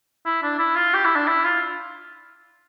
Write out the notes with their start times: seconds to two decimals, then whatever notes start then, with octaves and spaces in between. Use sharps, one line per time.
0.25 E4
0.43 D4
0.59 E4
0.76 F4
0.94 G4
1.04 E4
1.16 D4
1.28 E4
1.45 F4